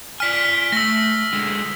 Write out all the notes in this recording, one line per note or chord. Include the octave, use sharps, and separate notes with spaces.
D5 G#5 F6 B6
A3 E6 A#6
D3 G#3